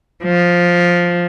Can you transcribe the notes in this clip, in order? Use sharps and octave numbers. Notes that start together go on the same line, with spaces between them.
F3